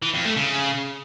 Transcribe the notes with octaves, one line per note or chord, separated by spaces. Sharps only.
E3
F2
A3
C#3